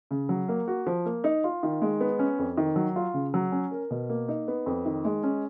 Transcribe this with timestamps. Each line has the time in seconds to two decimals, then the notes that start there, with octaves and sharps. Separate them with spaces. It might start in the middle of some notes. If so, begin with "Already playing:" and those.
0.11 C#3
0.29 F#3
0.49 A#3
0.68 F#4
0.87 F3
1.06 A#3
1.24 D#4
1.44 F4
1.63 D#3
1.82 G#3
2.00 B3
2.19 C#4
2.39 F2
2.58 D#3
2.76 F#3
2.96 F4
3.14 C#3
3.34 F#3
3.52 C#4
3.71 A#4
3.91 B2
4.09 A#3
4.28 D#4
4.48 B3
4.66 F2
4.85 D#3
5.05 G#3
5.23 C#4